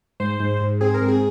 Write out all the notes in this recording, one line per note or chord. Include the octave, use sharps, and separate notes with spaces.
G#2 C5
G#2
G#2
C4 G#4
A#4
G#2
G#4